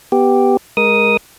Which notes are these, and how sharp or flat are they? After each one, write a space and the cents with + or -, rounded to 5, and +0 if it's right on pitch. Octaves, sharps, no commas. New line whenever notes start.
B3 +0 G4 +5
G#3 +0 A#4 +15 D#6 +0